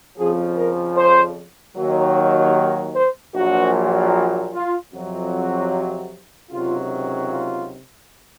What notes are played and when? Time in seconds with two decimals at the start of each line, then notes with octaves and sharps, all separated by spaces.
0.18 F2 C#3 F3 G#4
0.57 A#4
0.97 C5
1.76 D#2 D#3 F#3
2.95 C5
3.35 A#1 A#2 F#3 F#4
4.53 F4
4.92 F2 C3 F#3
5.32 F#4
6.51 C#2 C3 D#3 F#3 F4
7.31 F4